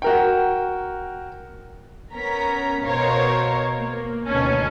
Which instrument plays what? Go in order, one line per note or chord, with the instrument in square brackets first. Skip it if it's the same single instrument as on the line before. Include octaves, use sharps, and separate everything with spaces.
[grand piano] F#4 A#4 G5
[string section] B3 C#4 A#4 A#5 B6
B2 A#4 C5 C#5 F5 C#6
A#3
D2 B2 D#3 C#4 G#5 A5